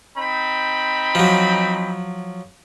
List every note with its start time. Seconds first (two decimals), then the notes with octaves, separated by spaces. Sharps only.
0.18 C4 D#4 B5
1.15 F3 F#3